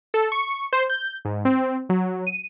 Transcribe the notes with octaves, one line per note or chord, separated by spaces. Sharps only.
A4
C#6
C5
G6
G#2
C4
F#3
D#7